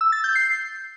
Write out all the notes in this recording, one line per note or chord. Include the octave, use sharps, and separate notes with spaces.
E6
A6
G6
C7